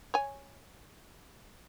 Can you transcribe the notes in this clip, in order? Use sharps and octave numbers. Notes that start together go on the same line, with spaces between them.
C#5 G#5